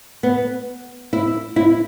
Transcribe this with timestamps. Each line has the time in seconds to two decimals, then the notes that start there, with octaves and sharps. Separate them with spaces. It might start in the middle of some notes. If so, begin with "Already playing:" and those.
0.23 B3
1.13 E4
1.56 E4